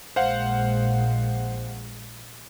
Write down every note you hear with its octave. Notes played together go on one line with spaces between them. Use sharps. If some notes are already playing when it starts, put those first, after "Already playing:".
A#1 G#3 C5 F5 F#5